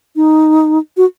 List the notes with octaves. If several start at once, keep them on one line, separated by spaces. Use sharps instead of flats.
D#4
F#4